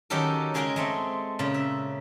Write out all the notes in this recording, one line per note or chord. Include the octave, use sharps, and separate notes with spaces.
D#3 F#3 C#4 G4 A4 A#4
C#3 G#3 G#4 A#4 G5 A#5
G#3 A3 C4
A#2 C#3
E5